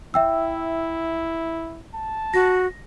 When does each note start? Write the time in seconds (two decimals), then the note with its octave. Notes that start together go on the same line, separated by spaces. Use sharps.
0.14 E4 E5 G5 E6
1.95 A5
2.34 F#4 A#6